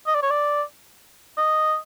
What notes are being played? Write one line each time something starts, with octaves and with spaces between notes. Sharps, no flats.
D#5
D5
C#5
D5
D#5